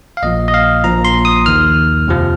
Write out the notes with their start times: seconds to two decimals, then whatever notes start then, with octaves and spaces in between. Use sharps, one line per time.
0.17 F5
0.23 A#1 A#2 F3 D#5
0.48 D#5
0.54 F5
0.84 A#1 A#2 F3 A#5
1.05 C6
1.25 D#6
1.46 D#2 D#3 F6
2.07 F2 C3 F3